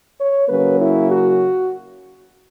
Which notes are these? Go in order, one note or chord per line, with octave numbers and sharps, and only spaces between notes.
C#5
C#3 F#3 A#3 C#4 B4
E4
F#4